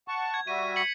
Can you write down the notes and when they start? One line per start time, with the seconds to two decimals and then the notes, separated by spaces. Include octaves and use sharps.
0.08 F#5 A5 C#6
0.34 G#6
0.47 G3 F#4 E5 D#7
0.76 B6 C#7 F#7